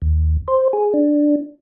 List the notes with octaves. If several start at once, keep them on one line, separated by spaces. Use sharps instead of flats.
D#2
C5
G#4
D4